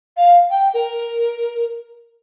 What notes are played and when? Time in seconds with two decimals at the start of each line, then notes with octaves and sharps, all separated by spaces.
0.17 F5
0.50 G5
0.74 A#4